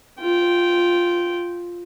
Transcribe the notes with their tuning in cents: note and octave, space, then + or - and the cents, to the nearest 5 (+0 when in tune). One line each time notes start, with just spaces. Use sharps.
F4 +0 G5 -10